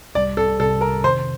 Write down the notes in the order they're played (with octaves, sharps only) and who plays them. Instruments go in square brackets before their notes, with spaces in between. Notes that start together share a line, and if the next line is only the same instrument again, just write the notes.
[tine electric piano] C2 C3 G3 [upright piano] D5
[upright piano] A4
[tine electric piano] C2 C3 G3 [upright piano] A4
[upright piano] A#4
[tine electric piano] F2 C3 D#3 [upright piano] C5